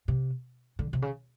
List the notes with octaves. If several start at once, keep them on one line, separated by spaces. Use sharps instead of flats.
C3
D3
C3
C#3